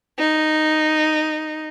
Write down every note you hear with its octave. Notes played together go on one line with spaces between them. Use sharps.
D#4